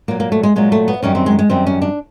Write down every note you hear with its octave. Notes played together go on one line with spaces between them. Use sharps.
A#2 F#3 A#3
A#3
A3
G#3
A#2 F#3 G#3
A3
B3
F#2 D#3 G3 C#4
C4
G#3
G#3
F#2 D#3 G3 C4
C#4
D4